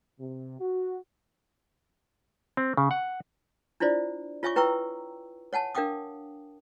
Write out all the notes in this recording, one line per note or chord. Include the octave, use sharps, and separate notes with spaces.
C3
F#4
C4
C#3
F#5
D4 E4 F4 C5 D5
F4 C#5 E5 G#5 C#6 D6
E4 B4 G5 A#5 C#6 E6
C#5 F#5 G#5 A5
D4 A#4 F5 G5 D6 D#6